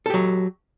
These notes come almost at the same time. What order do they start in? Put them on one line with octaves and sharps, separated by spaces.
A4 G4 F#3